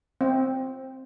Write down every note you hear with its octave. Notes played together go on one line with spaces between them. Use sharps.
C4